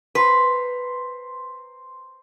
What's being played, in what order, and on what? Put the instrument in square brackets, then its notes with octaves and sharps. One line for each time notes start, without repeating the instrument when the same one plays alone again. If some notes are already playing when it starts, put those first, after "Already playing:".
[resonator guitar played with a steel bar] B4 [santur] C5 A#5 C6